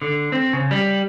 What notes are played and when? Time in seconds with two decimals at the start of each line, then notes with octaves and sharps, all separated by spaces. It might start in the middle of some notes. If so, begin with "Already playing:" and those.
0.02 D3
0.32 C4
0.53 C#3
0.71 G3